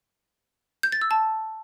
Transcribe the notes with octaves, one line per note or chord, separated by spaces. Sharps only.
G6
A6
E6
A5